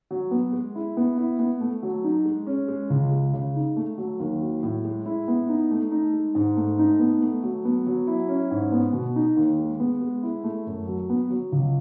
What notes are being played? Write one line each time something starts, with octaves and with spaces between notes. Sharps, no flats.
F#3
B3
G#3
E4
B3
E4
B3
A3
F#3
D#4
G#3
C#4
G#3
C#2
G#3
C#3
D#4
A3
F#3
D#2
F#3
A2
G#3
E4
B3
D#4
A3
D#4
G#3
G#2
A3
D#4
B3
A3
F#3
B3
F#3
E4
C#4
G#2
B3
B2
D#4
D#2
G#3
B3
G#3
E4
A3
F#2
F#3
B3
F#3
C#2